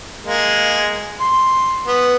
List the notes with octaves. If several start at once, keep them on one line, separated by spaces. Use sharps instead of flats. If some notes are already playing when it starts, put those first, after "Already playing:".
G#3 A#3
C6
B3